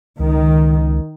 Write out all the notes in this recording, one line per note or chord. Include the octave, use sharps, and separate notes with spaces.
C#2 D#3